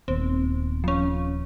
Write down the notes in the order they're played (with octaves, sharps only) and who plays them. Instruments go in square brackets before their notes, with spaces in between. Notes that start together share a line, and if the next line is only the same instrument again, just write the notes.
[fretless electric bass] D#1 D#2 B3 [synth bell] C4
[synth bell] F3 C#4